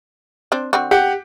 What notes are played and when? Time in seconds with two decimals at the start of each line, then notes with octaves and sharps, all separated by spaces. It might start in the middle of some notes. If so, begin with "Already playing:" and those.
0.52 C4 D4 C5
0.73 D3 C4 F#4
0.91 G4 F#5